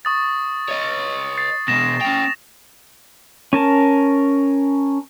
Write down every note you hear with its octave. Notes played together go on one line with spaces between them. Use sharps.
C#6 D#6 A6
C#5 D#5
A6 C7
B2 G#3 A#6 E7
C#4 G5 F7
C#4 A#4 A5